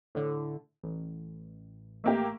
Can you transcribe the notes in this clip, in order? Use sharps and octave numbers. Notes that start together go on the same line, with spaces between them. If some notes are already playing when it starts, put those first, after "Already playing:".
A2 D3
A1
A3 A#3 G4